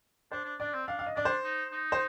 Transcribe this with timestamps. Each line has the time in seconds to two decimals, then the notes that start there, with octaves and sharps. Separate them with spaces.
0.32 D4 C5
0.45 D4
0.60 D4 D5
0.73 C4
0.87 D4 F5
0.99 F5
1.06 D#5
1.16 D4 D5
1.25 C5
1.44 D#4
1.72 D#4
1.92 C5